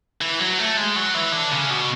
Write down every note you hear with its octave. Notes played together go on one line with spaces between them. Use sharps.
E3
F#3
A3
G#3
F#3
E3
D3
C#3
B2